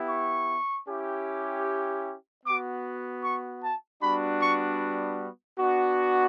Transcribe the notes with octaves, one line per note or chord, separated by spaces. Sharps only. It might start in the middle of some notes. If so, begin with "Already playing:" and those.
Already playing: B3 E4 G4
C#6
C#4 E4 G4
B3 F#4 D6
C#6
A5
G3 B3 D4 F#4 B5
C#6
B3 D4 F#4